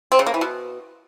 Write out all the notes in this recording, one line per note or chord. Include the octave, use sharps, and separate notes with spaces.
C4
C#3
A#3
E3
B2